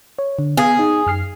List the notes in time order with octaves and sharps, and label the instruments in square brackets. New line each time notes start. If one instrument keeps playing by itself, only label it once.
[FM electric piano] C#5
D3
[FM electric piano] B3 F5 [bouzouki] G#4
[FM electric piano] D#4
F#2 F6 C7